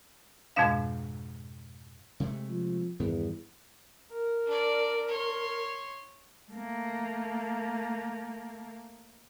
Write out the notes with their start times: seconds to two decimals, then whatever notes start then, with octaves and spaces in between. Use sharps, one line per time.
0.56 F2 G#2 B2 G#3 D4 F5
2.20 C3 G#3 A3
2.49 F3
3.00 E2 G2 D#3 B3
4.12 A#4
4.46 D4 D5
5.08 C#5 C6
6.52 A3 A#3